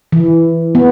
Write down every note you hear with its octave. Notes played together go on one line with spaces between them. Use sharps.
E3
B3